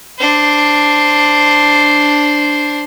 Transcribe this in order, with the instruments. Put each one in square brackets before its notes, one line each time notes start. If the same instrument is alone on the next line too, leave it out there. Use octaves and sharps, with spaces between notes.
[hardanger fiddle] D4 C5